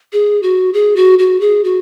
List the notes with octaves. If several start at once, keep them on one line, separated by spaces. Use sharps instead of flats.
G#4
F#4
G#4
F#4
F#4
G#4
F#4